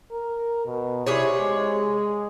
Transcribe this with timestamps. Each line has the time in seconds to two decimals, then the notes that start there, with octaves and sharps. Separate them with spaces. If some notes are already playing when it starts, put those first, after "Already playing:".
0.11 A#4
0.66 B2
1.07 C3 E4 G#4 C#5
1.40 G#3